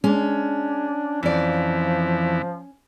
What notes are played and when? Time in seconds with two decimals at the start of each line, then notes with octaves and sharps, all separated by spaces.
0.04 G#3 C#4 D4
1.23 F2 E3 F3 D5